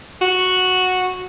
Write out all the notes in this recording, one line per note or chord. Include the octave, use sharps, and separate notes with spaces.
F#4